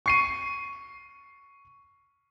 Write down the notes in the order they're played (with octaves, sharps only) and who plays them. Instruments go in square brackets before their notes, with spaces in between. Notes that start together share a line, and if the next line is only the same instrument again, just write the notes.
[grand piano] C#6 C7 D#7